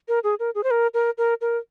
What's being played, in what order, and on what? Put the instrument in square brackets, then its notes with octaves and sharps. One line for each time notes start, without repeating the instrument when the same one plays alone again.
[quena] A#4
G#4
A#4
G#4
C5
A#4
A#4
A#4
A#4